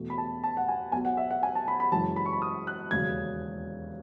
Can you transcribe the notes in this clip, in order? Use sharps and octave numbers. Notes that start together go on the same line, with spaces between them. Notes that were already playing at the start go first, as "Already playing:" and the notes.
Already playing: E2 B2 A3
B5
A5
A5
F#5
G#5
B1 B2 F#3 G#5
F#5
E5
F#5
G#5
A5
B5
B5
F#1 F#2 E3 G#3 A5
B5
C#6
B5
D#6
F#6
E1 D#2 C#3 F#3 G#6